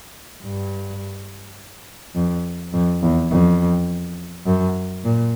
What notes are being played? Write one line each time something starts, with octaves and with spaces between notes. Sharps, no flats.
G2
F2
F2
E2
F2
F#2
A#2